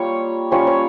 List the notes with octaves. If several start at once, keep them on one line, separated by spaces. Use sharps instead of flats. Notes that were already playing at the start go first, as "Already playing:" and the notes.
Already playing: G3 A#3 F4 C#5
G3 C#4 F4 C#5
C#5